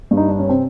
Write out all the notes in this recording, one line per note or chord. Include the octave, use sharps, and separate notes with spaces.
G2
D#4
D4
C#4
C3 C4